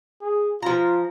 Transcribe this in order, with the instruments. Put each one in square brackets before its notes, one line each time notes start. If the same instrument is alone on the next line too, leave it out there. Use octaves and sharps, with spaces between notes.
[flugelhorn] G#4
[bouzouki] F3 A#5 [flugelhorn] F4